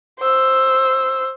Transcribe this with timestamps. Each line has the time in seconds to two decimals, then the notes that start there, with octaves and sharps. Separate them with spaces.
0.19 C5 E6